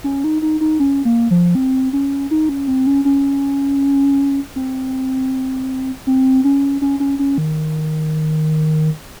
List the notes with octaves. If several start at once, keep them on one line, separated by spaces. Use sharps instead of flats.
C#4
D#4
D#4
D#4
C#4
A#3
F3
C4
C#4
D#4
C#4
C4
C#4
C#4
C4
C4
C#4
C#4
C#4
C#4
D#3